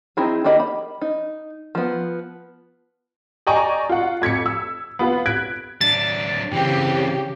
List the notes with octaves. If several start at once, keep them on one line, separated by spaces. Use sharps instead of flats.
C4 D#4 E4 G#4
D#3 A#3 G4 D#5 B5
B5
D#4
F3 B3
D5 D#5 G5 G#5 A#5 C#6
F4 F#5
F2 G#6 B6 C#7
E6
B3 F4 B4
F#6 G#6 B6 D7
F#3 D4 A6
C#3 E3 C4 G4